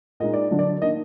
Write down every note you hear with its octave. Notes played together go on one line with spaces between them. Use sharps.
A#2 G#3 D#4 D#5
D5
D3 F#3 D4
D5
D#3 A#3 D4 D#5